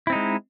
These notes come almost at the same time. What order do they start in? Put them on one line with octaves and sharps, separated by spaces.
E4 C4 D#4 G#3